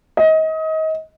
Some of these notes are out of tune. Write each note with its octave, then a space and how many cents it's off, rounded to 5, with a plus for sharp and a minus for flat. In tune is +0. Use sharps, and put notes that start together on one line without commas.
D#5 +30